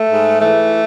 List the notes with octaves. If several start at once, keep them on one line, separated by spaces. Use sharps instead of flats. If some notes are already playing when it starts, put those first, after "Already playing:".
Already playing: A3
G#2
E3 A3